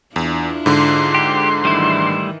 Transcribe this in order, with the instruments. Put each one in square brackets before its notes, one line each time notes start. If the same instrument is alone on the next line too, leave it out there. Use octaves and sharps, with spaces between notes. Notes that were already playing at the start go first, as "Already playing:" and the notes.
[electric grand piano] E2 [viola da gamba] D4 E4 F4
[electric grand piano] G#2 D3 [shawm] C6
[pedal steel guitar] G4
[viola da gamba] D#3 E3 [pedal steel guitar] G3 A3 E4